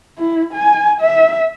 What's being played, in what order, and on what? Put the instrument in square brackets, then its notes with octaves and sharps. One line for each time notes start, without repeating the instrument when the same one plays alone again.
[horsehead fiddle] E4
G#5
E5